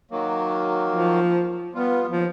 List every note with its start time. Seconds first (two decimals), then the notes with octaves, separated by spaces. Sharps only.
0.11 D#3 F#3 A#3
0.90 F3
1.74 G3 B3 F4
2.09 D#2 F3